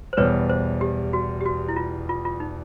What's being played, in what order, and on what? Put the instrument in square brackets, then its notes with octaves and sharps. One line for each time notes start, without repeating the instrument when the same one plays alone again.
[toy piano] C5
[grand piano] E2 B2 G3 [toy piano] B4 C#5
[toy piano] C5
G4
F#4
G4
F#4
E4
F4
F4
F4
D#4